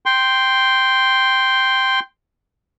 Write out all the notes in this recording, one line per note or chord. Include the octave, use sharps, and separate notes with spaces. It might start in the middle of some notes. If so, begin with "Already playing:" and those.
G5 C6